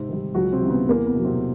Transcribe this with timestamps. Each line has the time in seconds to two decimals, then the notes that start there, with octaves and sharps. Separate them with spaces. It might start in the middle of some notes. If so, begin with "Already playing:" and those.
Already playing: G#2 C3 C4
0.09 D#3 G3
0.34 C#2 F#3 F#4
0.52 C3 C4
0.61 C#3 E3 G3
0.70 B3
0.88 E2 A#3
1.07 B3
1.15 B2 F#3
1.24 C3 C4